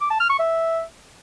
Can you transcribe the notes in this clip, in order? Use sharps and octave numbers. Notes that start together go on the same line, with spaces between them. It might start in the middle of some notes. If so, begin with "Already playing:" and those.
D6
A5
F6
C#6
E5